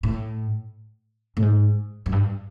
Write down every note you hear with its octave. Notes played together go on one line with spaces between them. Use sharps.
A2
A2
G#2
F#2
G2